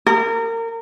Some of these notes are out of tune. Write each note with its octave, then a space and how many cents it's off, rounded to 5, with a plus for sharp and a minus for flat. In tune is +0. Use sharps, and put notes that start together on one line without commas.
A#4 -30